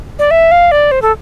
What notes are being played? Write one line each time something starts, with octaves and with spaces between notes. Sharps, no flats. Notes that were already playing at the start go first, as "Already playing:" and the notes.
D5
E5
F5
D5
C5
A4